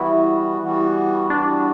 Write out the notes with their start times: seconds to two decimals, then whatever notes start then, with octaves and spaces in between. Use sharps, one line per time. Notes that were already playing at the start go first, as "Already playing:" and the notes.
Already playing: E3 G3 B3 E4 F#4
0.59 E3 G3 B3 F#4
1.30 E3 G3 B3 D4 F#4